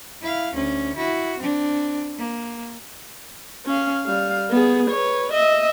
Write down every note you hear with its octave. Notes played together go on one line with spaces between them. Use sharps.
E4 F5
D2 C#4
E4 F#4
C4 D4
A#3
C#4 F5
G3 F5
B3 G#4
B4 C#5
D#5 E5